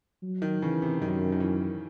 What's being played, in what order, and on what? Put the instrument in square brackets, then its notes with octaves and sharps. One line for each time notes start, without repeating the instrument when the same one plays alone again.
[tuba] F#3
[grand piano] D#3
[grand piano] C#3 [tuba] E3
[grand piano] C3
[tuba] F#2 [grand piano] D#3
[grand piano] D#3
E3